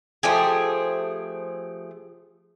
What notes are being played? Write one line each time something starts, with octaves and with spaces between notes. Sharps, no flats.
F3 A3 G4 G#4